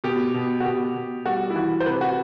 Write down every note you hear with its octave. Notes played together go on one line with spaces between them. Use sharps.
B2 G4
B2
F#4
B2 G4
B2
G3 F#4
E4
E3 F#4
C5
C3 B4
F#4